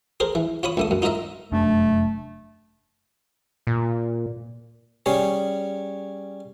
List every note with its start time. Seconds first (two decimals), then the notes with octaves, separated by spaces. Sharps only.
0.20 G#4 A#4 C5
0.35 E3
0.63 F4 C#5 B5 D#6
0.77 C#2 A3 D#6
0.91 F#2
1.02 D#4 F4 A#4 D#5 E5
1.52 F1 F#2 A3 D4
3.67 A#2
5.06 G3 C#4 G#4 C#5